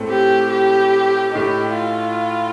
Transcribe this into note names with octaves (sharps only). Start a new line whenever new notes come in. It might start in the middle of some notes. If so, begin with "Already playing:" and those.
Already playing: A2 A3 C4
G4
G4
A2 A3 D#4 G4
F4